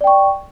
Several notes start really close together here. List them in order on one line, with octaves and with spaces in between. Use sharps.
D5 G5 C#6